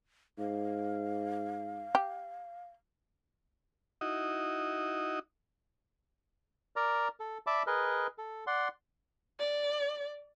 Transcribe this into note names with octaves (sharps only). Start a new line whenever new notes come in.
G#2 F5
G4
D#4 E4 F#4 D#5
A#4 D5 A#5
A4
D5 E5 A5 B5 D6
G#4 A#4 B4 D#5
A4
D5 F#5 C6
D5